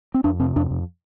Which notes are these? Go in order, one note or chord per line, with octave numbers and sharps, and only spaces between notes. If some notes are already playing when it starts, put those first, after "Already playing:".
C4
F2 D4
C3 C4
F2 D4
F2